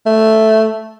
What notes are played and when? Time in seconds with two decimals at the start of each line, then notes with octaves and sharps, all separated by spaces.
0.06 A3